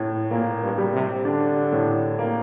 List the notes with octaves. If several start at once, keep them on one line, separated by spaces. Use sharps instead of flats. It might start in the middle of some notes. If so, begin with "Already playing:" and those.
Already playing: A2
A#2 A#3
G2
G3
C3
D3 D4
A2
A#3